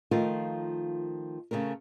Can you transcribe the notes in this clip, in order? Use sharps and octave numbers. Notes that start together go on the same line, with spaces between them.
D#3 F3 A3 F4 A#4
C#3 A3 C4 A#4